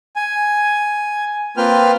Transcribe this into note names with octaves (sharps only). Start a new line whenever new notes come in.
G#5
A#3 C4 F4 B4 G5 F6